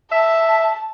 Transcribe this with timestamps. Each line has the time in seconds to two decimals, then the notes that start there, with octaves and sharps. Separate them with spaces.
0.12 E5 A5